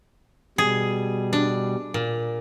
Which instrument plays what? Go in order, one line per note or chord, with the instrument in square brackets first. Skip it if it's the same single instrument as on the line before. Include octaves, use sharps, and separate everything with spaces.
[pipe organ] B2 G3 [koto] G#4
[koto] D4
A#2